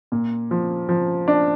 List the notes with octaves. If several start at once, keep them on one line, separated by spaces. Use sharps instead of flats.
A#2
F3
F3
D4